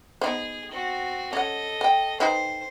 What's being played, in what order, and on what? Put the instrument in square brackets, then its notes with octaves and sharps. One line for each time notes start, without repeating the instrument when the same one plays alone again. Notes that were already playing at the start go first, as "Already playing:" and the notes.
[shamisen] B3 D#4 C5 [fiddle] G#4
[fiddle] C4 F#4
[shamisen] C#4 F#5 [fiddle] A4 D#5
[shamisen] G5 G#5
[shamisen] C4 D#4 B4 [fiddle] C5